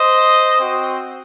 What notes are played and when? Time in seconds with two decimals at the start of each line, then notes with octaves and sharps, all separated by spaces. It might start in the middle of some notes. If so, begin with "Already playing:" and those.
Already playing: C5 D#5
0.59 C4 F#4